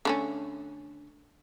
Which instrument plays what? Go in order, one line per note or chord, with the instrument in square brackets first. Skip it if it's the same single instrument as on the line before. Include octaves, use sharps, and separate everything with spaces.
[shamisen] D3 A3 C#4